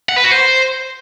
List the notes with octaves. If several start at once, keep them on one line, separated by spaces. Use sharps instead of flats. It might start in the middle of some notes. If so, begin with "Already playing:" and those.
F#5
B4
F#4
C5